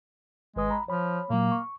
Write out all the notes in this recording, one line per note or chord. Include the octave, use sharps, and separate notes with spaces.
G#1 G#3 B4 D#6
A#5 B5
F3 C#5 B5
A#2 F#3 A#3
C#6